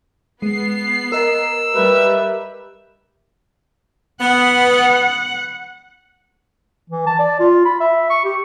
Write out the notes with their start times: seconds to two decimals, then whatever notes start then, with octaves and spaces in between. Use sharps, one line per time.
0.42 G#3 B3 C7
1.12 A#4 D#5 A#5 E6
1.74 G3 B4 E5
4.21 B3 F#5
6.90 E3
7.07 A5
7.19 D5
7.40 F4
7.65 B5
7.80 E5
8.10 C#6
8.24 G4